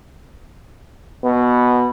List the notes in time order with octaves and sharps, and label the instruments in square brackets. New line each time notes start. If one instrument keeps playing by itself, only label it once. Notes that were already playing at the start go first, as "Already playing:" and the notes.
[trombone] B2 [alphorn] B3